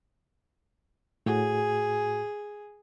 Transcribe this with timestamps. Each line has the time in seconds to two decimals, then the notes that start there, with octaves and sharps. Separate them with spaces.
1.26 A2 F#4 G#4